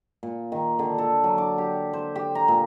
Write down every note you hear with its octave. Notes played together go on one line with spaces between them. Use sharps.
A#2
D#3
D3
A4
F#3
D6
G4
C5
G4
A#5
A#2